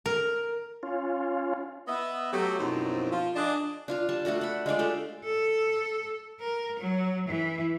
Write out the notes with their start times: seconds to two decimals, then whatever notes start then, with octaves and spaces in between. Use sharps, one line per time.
0.06 A#4
0.83 C#4 F4
1.87 B3 D#5 E5
2.32 F#3 A3 G4
2.59 F#2 B2 F3 C4 D#4 E4
3.11 F3 F4
3.35 D4 G#4 D#5
3.88 D4 F4 F5
4.09 G3 A5
4.25 A3 D4 F#4 A4
4.41 F#5 B5
4.66 G#3 D4 F4 D5
4.79 A3 G4 A4
5.25 A4
6.41 A#4
6.79 F#3
7.27 E3